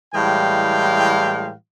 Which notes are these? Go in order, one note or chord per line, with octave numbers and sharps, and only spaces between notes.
A2 E3 G3 G#3 F5 G5